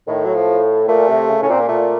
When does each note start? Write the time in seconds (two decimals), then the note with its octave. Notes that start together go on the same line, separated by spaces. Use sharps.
0.08 A2 D#3
0.25 F#3
0.35 F3
0.88 A#2 A3
1.09 C3
1.28 C#3
1.42 A2 C#4
1.49 A#2 C4
1.61 A#3
1.69 A#2 A3